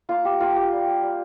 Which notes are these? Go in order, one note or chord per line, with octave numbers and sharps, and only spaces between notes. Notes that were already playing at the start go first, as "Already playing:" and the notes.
A#3 F4
F4 G4
A#3 F4
A#3 G4
G3
A#3
G3